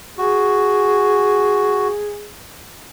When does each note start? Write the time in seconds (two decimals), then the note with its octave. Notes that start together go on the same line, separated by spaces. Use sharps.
0.18 F#4 G#4